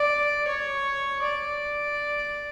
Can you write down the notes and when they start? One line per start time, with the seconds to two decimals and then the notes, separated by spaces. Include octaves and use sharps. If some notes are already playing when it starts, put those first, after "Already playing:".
Already playing: D5
0.48 C#5
1.24 D5